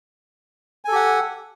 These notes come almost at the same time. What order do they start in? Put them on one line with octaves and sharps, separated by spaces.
G#5 A4 G4 F#5